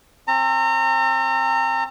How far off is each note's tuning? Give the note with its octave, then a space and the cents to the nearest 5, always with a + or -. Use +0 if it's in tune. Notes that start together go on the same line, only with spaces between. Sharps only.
C4 +35 A#5 -35